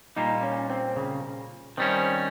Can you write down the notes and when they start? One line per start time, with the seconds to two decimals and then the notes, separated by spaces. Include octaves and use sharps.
0.16 A#2 G3 A#3 D#4
0.43 C#4
0.70 C4
0.96 C#3
1.77 D#3 G3 C4 C#4